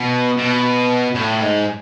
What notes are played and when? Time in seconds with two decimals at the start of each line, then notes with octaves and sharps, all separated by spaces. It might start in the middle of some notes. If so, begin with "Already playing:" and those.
Already playing: B2
0.38 B2
1.15 A2
1.41 G#2